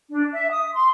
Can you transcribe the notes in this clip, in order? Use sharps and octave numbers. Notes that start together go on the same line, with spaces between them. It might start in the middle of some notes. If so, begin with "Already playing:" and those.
D4
E5
D#6
C6